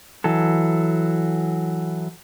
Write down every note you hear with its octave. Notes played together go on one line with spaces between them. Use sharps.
E3 F#3 A4